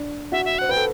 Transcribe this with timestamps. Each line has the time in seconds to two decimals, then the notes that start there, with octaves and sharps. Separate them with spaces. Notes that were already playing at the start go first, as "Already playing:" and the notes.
Already playing: D4
0.32 F#4 E5
0.45 E5
0.59 C5 F#5
0.69 B4 G5
0.77 A4